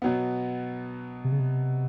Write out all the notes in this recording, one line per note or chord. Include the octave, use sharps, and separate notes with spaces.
B2 F#3 B3
C3
C#3
C3